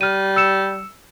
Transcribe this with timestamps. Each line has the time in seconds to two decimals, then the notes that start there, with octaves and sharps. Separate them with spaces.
0.01 G3 F6 D#7
0.36 E6 C#7 E7